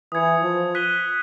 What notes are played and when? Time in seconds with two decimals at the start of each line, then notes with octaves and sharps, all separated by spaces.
0.12 E3 D#6 G#6 C#7
0.43 F3
0.75 F#6 B6 D#7 G7